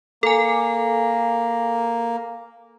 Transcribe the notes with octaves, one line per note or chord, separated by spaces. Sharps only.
A#3 A4 G#5